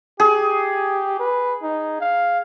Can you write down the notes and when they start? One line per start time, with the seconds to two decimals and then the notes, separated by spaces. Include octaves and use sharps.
0.20 G4 G#4
1.20 B4
1.63 D#4
2.01 F5